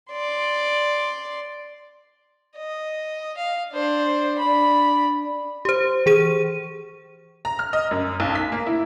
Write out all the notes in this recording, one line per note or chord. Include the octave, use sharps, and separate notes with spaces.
D5 C6
D#5
F5
D4 C5
D4 B5
G4 C5
E3 G#4 D#7
A#5
F6
D#5
F#2
B1
B6
A#3
E4